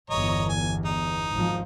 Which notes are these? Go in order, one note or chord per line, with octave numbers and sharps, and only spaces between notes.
G1 E2 C#5 D#5 A#5
G#5
D#4
G#1 F3